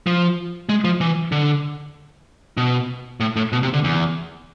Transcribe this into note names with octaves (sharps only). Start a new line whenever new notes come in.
F3
G#3
F3
E3
D3
B2
A2
A2
B2
C3
D3
E2